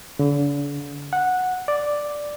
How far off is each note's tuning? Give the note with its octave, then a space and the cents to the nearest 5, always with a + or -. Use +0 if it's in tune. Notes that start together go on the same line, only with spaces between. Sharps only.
D3 -40
F#5 -10
D5 +0